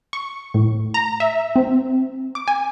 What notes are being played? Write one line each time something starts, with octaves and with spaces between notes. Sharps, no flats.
C#6
A2
A#5
E5
C4
D6
G#5